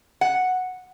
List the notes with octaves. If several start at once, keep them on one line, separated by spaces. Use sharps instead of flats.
F#5